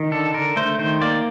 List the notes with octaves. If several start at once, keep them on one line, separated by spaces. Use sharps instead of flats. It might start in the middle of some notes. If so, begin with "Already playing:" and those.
Already playing: D#3
D3 A4
D3 A#4
A3 C5
D#3 C5
A#3 D5